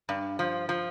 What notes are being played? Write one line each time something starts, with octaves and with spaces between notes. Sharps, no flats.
G2
F3
F3